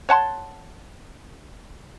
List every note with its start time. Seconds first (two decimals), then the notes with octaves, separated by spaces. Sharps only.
0.09 C#5 F#5 A5 C6